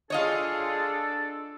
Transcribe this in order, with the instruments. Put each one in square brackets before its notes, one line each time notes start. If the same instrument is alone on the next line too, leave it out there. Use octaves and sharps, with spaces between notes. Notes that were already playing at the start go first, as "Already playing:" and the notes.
[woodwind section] D4 A4 [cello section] F4 G#4 [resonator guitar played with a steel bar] C#5 D#5 F5